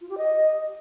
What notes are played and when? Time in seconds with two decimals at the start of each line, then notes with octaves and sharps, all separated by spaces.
0.01 F4
0.09 G4
0.18 D#5